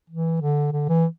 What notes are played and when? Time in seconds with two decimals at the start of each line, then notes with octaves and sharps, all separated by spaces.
0.10 E3
0.41 D3
0.72 D3
0.89 E3